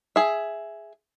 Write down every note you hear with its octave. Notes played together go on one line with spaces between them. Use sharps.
G#4 E5